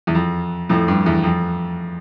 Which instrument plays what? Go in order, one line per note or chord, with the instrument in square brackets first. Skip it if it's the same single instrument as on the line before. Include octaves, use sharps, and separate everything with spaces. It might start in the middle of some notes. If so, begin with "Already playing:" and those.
[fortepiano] E2
F2
F2 A2
G2
E2
F2